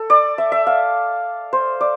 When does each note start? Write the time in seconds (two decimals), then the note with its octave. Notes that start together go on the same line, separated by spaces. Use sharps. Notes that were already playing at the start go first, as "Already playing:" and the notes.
Already playing: A4
0.10 D5
0.38 E5
0.52 E5
0.67 F5
1.53 C5
1.81 D5